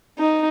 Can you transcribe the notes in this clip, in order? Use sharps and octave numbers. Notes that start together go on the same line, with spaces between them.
D#4